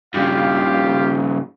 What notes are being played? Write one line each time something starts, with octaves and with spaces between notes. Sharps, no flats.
G2 C#3 F4 G4 F5